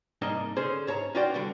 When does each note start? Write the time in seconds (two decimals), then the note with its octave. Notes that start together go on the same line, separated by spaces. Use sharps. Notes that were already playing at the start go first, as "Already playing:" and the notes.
0.22 C2 G#2 A#3 D4 D#4 D#5
0.56 D3 C#4 G#4 C5
0.87 G#2 C#5 A5 A#5
1.15 C#4 F4 F#4 D5 G5
1.34 D2 D3 G3 D4